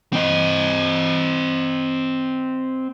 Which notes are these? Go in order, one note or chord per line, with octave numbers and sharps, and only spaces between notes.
C4 D#5